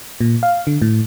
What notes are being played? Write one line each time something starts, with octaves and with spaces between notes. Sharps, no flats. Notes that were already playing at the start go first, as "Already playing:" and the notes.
A#2
F5
D3
A2